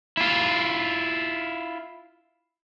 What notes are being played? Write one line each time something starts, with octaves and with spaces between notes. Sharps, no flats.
E4 F4